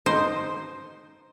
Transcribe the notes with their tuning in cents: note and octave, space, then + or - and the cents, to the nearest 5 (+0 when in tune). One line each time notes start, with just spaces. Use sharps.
D#4 +0 C5 +0